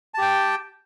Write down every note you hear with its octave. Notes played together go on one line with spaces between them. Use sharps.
G4 G5 A5